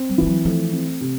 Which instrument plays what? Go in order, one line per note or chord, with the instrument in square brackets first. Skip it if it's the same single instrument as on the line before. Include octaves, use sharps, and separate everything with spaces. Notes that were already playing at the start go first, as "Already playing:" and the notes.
Already playing: [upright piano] C4
[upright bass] G3
[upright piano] E3 [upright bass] F3
[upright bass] F#3
[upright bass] F3 [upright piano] A3
[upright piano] C4
C3